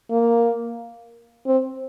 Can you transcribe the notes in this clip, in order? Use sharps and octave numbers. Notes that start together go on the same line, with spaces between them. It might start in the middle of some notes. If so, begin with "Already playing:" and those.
A#3
C4